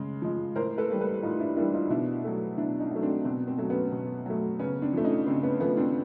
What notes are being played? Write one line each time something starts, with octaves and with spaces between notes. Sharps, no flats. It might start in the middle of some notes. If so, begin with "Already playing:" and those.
Already playing: C#3 G#3
F3 G#3
A2 A#4 C5
A4 B4
E3 G3 A#3
A4 B4
A2 D#4 F4
D4 E4
E3 G3 A#3 D4 E4
D#4 F4
B2 D4 E4
F#3 A3
B2 D4 E4
C#4 D#4
F#3 A3
C4 D4
B2 C4
C4
F#3 A3
B3 C#4
B2
F#3 A3
C#3 B3 C#4
C4 D4
F3 A3
C#4 D#4
C#3 C4 D4
B3 C#4
F3 A3 B3 C#4
C4 D4